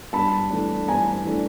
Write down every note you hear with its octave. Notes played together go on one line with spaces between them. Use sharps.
G2 A5 B5
E3 A3 D4
G2 G#5 A#5
E3 A3 D4